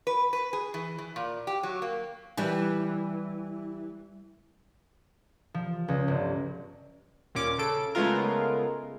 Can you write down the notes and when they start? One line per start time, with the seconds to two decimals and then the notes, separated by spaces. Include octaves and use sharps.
0.07 B4
0.33 B4
0.53 G#4
0.74 E3
0.98 E3
1.16 A#2
1.47 G4
1.63 F#3
1.82 A#3
2.37 E3 G3
5.54 F3
5.88 C#2
6.08 G1
7.35 D#2 A#2 C#4 D6
7.58 C#3 A4 D7
7.95 C#3 G#3 A3 B3 F4 A#4